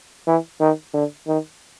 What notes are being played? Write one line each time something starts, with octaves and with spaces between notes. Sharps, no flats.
E3
D#3
D3
D#3